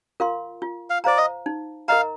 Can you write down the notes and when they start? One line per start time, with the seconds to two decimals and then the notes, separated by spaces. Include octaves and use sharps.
0.20 F4 A#4 F5 C6
0.62 F4
0.90 F5
1.04 C5 D5 F5 A#5
1.17 D#5
1.46 D#4
1.88 A#4 D#5 F5 A#5